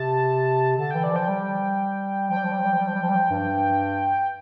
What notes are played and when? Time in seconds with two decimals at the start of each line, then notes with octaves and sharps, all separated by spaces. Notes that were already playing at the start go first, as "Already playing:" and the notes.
Already playing: C3 A5
0.78 D3 A5
0.91 E3 G5
1.03 D5
1.12 F3 G5
1.28 G3
2.29 F3 G5
2.37 G3
2.44 F3
2.52 G3
2.59 F3
2.65 G3
2.73 F3
2.80 G3
2.87 F3
2.95 G3
3.02 F3
3.09 G3
3.15 F3
3.30 G2